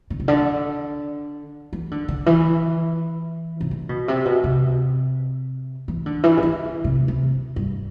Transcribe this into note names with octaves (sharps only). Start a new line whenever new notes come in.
D3
C3
D3
E3
D3
D3
E3
C3
D3
B2
C3
B2
C3
E3
D3
E3
C3
D3
C3
C3
G2